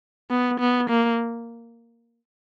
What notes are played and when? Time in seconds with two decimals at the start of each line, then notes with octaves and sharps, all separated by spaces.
0.31 B3
0.60 B3
0.90 A#3